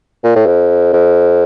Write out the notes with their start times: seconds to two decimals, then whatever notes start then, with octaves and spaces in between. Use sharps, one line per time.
0.24 A#2
0.36 A2
0.47 F2
0.93 F2